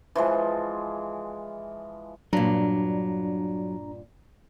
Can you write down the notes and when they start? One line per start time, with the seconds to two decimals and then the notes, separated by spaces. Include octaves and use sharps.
0.15 E3 F3 G#3
2.33 G2 A#2 F#3 D4 A#5